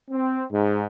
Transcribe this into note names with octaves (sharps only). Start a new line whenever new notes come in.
C4
G#2